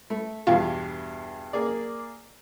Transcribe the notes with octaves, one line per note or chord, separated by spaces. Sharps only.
A3
E2 G2 B2 F4
A#3 G#4 D5